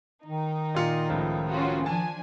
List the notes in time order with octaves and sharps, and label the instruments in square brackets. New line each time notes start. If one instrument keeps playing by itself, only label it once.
[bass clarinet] D#3 [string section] D#4
[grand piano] A#2 F4 C#7
C#2 A2 F3
[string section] C#4 F4 F#4
[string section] F3 D4 G#5 [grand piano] A5